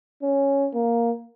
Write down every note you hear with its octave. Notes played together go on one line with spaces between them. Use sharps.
C#4
A#3